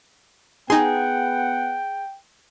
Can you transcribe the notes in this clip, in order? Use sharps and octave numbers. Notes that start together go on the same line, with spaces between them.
B3 D#4 G#4 F#5 G5 C6